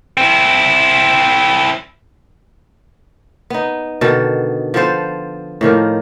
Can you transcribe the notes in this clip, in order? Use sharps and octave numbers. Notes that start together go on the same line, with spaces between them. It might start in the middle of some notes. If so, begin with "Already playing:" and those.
C4 E4
B3 D#4
B2 D3 D#3 A4
F3 B3 A4 C5
A2 D#3 F3 A#3